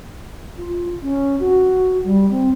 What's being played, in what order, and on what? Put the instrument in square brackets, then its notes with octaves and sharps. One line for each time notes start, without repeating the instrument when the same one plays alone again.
[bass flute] F4
C#4
F#4
G3
C4